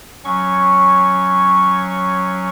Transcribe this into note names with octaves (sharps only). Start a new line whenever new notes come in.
F#3 C#4 C#6